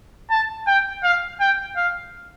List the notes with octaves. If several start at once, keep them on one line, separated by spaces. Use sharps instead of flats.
A5
G5
F5
G5
F5